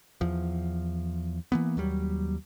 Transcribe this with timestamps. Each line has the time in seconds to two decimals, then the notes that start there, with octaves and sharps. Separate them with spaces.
0.21 E2 F3
1.52 E3 A#3 B3
1.77 D#2 F#3 G3